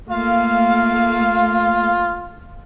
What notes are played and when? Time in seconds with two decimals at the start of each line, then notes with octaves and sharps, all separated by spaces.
0.10 A3 A#3 F4 F5